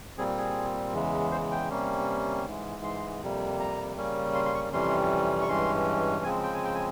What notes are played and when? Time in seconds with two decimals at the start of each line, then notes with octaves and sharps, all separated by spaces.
0.18 A#2 G3 C4 G#4
0.38 G#4
0.94 E2 C#3 E3 G#3
1.31 C5
1.51 G5
1.70 C3 G3 A#3 C#4
2.45 G#2 E3 G#3
2.84 C6
3.21 F2 C3 G3 A#3
3.60 A#5
3.97 C#3 G3 A#3 C#4
4.35 C6
4.45 C6
4.55 C#6
4.73 F2 C3 E3 G3 C#4 C6
5.42 C#6
5.48 G2 E3 G#3 C#4 C6
6.24 C#3 F3 G#3 C4 G#5
6.43 G5
6.54 G#5
6.64 G5
6.75 G#5